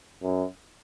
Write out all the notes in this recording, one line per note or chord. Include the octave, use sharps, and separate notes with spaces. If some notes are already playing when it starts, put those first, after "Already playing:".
F#2